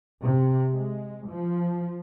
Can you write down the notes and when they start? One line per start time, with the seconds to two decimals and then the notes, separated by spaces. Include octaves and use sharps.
0.22 C3
0.72 G#3
1.28 F3